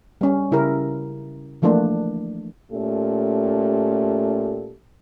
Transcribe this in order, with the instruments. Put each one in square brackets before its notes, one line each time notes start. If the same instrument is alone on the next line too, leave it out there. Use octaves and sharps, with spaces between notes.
[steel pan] G3 C#4
C#3 E4 G4 A#4
E3 F3 A3 A#3 D4
[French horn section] A#2 A3 C#4 G4 A4